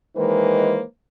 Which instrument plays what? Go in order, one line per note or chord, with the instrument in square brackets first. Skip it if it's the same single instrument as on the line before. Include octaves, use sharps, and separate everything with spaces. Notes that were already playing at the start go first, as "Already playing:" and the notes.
[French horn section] D#3 E3 G#3 A#3 B4 C5